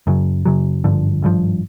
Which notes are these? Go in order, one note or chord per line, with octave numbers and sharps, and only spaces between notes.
F#2 C#3 F#3
F#2 C#3 F#3
G#1 G2 D3 F3
G#1 G2 D3 F3